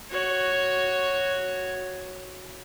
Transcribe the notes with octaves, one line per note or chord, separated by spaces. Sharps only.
F#4 C#5